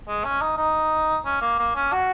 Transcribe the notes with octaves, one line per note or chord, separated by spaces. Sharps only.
G#3
C#4
D#4
D#4
C#4
A#3
A#3
C#4
F#4